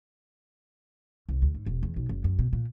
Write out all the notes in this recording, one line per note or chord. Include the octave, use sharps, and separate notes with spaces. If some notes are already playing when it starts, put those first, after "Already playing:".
C2
D2
G#2
E1
E2
B1
F#1
F#2
B2
A#2